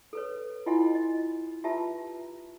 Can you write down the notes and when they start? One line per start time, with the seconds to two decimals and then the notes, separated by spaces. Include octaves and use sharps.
0.13 A4 B4 C#5
0.66 E4 F4 D#5 F#5 G#5 C6
0.95 D#5
1.64 F4 G4 B4 E5 A5 A#5